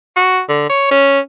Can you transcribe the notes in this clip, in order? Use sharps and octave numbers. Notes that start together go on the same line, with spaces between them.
F#4
D3
C#5
C#4